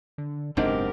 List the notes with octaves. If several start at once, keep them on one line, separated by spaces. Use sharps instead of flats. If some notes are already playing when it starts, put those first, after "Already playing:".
D3
F#1 G#2 B2 C4 D4 G4 A#4